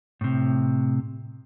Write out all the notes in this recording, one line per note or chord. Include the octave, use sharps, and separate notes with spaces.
A2 C3